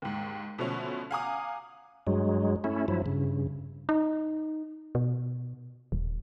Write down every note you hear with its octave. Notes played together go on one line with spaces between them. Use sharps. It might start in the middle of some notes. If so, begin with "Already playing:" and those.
D#2 G#2
B2 D3 F3 A3 C#4
F5 F#5 G#5 A#5 D6 D#6
G2 F#3 G#3
A3 C#4 E4
G2 F3 F#3 E4
G2 C#3
D#4
B2
D#1